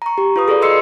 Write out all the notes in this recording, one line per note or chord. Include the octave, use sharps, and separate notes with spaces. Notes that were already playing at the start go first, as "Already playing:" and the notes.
A#5 C#6
G4
F4 B4 D#6
G#4 A4 B4 D5
A4 D#5 C6 E6 C7 C#7